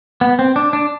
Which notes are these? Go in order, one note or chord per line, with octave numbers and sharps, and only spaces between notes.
B3
C4
D4
D4